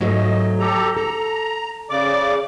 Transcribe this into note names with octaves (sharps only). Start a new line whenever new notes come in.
G#2 F#3 A3 D#5
G4 A4 A#5
A4 A#5
C#3 D5 D6